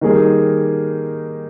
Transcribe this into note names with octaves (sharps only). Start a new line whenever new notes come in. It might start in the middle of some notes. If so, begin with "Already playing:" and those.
D#3 G3 A#3 D#4 G#4